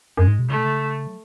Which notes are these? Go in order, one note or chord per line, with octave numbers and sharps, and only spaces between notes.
F#2 G#3
G#2
B2
C#3 A3
B2
C#3
F#3